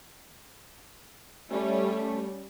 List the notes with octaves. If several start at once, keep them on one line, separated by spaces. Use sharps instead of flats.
G3 A3 C#4